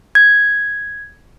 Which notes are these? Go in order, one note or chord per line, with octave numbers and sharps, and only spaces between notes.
G#6